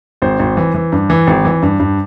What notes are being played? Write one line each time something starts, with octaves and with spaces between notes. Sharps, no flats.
G#1 C5
G#1
E3
E3
G2
E3
G#1
E3
G2
G2